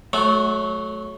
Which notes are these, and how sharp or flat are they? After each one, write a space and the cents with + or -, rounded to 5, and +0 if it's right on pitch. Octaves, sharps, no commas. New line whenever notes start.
F#3 +0 A3 -25